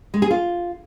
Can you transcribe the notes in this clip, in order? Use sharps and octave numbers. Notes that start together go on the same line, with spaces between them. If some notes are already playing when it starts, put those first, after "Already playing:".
G#3
G#4
F4